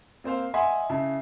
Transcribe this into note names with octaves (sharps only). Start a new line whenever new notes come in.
A#3 C4 C5 F5
D#5 E5 F#5 G#5 B5 C6
C#3 E4 A5